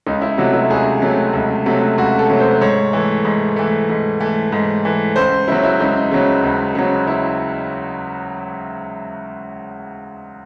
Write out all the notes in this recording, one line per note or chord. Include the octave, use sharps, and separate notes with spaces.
C#2 D#4
E4
C3 F#3 A3 F#4
E4
C#2 G#4
C3 F#3 A3
C#2
C3 F#3 A3
C#2 F#4
A4
C3 F#3 A3
C5
C5
G#2 C#5
E3 A3
G#2
E3 A3
G#2
E3 A3
G#2
E3 A3
C#2 C5
C#3 F#3 E4
E4
C#2 D#4
C#3 F#3
C#2
C#3 F#3
E4